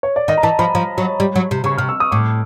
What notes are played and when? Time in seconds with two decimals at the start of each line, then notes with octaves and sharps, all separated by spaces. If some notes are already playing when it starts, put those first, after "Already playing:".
0.03 C#5
0.16 D5
0.28 D#3 D#5
0.37 A#5
0.43 E3 A5
0.59 F3 B5
0.75 F3
0.98 F#3
1.20 G3
1.36 F#3
1.51 C3
1.64 C#3 C#6
1.78 C3 F6
1.89 E6
2.00 D#6
2.11 A2 D6